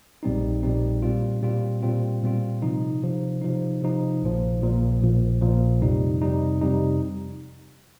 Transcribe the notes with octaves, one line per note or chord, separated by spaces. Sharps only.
A#1 A#2 G3 C4 D#4
A#1 A#2 G3 C4 D#4
A#2 G3 C4 F4
A#2 G3 C4 F4
A#2 G3 C4 F4
A#2 G3 C4 F4
C3 F3 D#4
C3 F3 D#4
C3 F3 D#4
C3 F3 D#4
A#1 A#2 F3
A#1 A#2 F3
A#1 A#2 F3
A#1 A#2 F3
F2 C3 G3 D#4
F2 C3 G3 D#4
F2 C3 G3 D#4